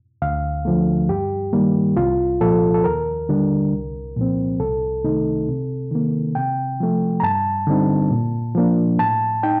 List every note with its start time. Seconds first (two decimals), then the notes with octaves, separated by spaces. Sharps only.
0.22 D2 F5
0.65 D3 F3 A3
1.09 G2 G4
1.53 D#3 G3 A#3
1.97 C2 F4
2.41 A#2 F3 A4
2.74 A4
2.84 D#2 A#4
3.29 D3 G3 D4
3.73 C2
4.16 A#2 F3 C4
4.60 C2 A4
5.04 C3 D#3 A3 D#4
5.48 C3
5.91 D#3 A#3
6.35 C3 G5
6.80 F3 A3
7.20 A#5
7.23 G2 A5
7.67 D3 G3 C4 D#4
8.11 A#2
8.55 F3 A#3 D4
8.99 A2 A5
9.43 D#4 G5